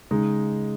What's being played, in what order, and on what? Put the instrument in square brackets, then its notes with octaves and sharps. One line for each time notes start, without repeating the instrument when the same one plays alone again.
[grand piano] C#3 G#3 D#4